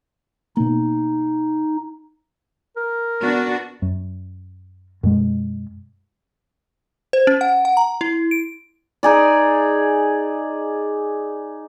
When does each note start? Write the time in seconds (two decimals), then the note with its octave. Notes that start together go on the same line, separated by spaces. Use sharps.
0.57 B2 A#3 D#4
2.77 A#4
3.22 B3 D4 F#4
3.82 F#2
5.03 F#2 B2 G#3
7.13 C5
7.27 C#4
7.41 F#5
7.65 F#5
7.77 A#5
8.01 E4
8.31 D7
9.03 D#4 G#4 D5